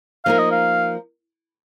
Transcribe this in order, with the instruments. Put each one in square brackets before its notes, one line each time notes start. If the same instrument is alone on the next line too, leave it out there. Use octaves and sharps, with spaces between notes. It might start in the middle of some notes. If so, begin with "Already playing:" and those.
[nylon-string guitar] F3 A#3 D#4 A#4 [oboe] F5
[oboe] D#5
F5